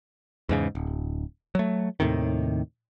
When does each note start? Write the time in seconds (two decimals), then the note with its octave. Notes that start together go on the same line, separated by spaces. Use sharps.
0.49 E2 G#2 C#3
0.75 D1
1.55 F#3 A3
2.00 D#2 A2 C3 D#3